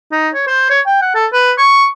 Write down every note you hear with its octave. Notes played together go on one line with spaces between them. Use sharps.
D#4
C#5
C5
C#5
G5
F#5
A4
B4
C#6